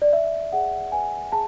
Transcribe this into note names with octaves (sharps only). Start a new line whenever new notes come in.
D5
D5 E5
G#4 F#5
B4 G#5
G#4 A5